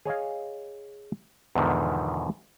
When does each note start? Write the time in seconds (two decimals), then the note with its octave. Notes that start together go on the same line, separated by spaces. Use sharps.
0.05 G#4 C#5 D#5 F5
1.55 E2 G#2 B2 D3 D#3 F3